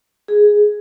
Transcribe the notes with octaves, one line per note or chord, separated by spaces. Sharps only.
G#4